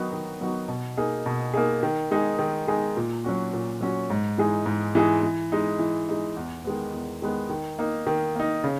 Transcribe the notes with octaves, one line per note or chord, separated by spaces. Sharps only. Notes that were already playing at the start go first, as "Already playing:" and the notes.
Already playing: D#3 F#3 B3 D#4 F#4
D#3
F#3 B3 D#4 F#4
B2
A#3 D#4 G#4
B2
A#3 D#4 G#4
D#3
G#3 D#4 G#4
D#3
G#3 D#4 G#4
A#2
F#3 C#4 F#4
A#2
F#3 C#4 F#4
G#2
E3 G#3 D#4 G#4
G#2
E3 G#3 D#4 G#4
E3
G#3 D#4
E3
G#3 D#4
E2
D#3 G#3 B3
E2
D#3 G#3 B3
D#3
A#3 D#4
D#3
A#3 D#4
C#3